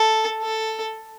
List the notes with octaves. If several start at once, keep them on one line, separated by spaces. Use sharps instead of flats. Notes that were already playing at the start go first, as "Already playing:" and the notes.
Already playing: A4
A4